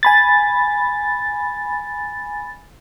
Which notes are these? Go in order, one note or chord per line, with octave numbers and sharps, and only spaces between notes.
G#5 B5 A6